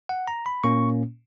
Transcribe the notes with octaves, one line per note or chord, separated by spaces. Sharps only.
F#5
A#5
B5
A#2 A#3 C#4 C#6